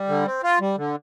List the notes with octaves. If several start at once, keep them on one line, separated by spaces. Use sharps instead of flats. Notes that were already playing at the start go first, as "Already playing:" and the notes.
Already playing: G3
D3
C4
F4
G3
D3